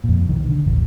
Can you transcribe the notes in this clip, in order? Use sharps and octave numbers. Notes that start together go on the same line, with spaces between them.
F2 A#2
B1 D#3
D3
D#1 A1